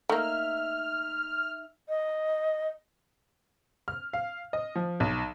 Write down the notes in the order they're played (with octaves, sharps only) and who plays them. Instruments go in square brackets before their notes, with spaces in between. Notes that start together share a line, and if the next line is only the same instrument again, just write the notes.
[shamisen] A3 A#3 [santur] D#4 E5 [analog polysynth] F6
[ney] D#5
[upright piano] F6
F5
D#5
F3
B1